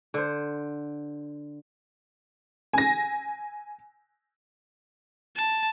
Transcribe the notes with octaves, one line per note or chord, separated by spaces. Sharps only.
D3 C5
G#5 A#6
A5